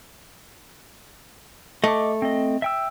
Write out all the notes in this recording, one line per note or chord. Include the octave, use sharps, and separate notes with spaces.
A3 D#5 D6
C4 D#5
E5 G5 E6